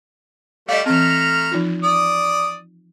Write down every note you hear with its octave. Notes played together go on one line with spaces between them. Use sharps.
G3 A3 D5 D#5 F5
E3 A3 C4 A#5 F6
F3 D#4 F4
D5 D#6